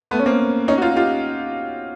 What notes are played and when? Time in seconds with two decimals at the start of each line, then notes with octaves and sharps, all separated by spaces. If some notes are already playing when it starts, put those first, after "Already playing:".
0.11 A3 B3
0.19 C#4
0.26 A#3 C4
0.68 C#4 D#4
0.78 F#4
0.82 D#4 F4
0.96 F4 G4